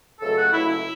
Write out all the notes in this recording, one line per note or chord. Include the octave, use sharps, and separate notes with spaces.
C#2 C#3 F#3 A3 A4
F#4
C#2 C#3 F#3 A3 E4
E4